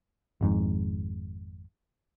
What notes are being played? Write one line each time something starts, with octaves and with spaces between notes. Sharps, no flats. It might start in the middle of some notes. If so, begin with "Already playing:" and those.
G#1 F2 G#2